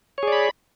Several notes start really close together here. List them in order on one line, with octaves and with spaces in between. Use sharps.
C#5 G#4 D5 B5